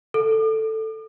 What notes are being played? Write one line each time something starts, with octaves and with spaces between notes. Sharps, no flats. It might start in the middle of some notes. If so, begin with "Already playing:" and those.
A4